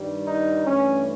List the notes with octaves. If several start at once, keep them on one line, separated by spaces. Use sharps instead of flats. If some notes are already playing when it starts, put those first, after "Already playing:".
Already playing: G2 D#3 G3
D#4
G2 E3 A3 C#4